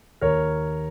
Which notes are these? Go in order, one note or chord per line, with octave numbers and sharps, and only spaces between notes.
D#2 A#4 C#5